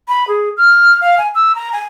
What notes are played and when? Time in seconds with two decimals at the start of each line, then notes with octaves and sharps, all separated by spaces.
0.08 B5
0.28 G#4
0.57 F6
1.01 F5
1.18 G#5
1.35 E6
1.55 A#5
1.73 G#5